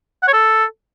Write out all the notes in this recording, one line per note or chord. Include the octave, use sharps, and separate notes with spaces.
F#5
C#5
A4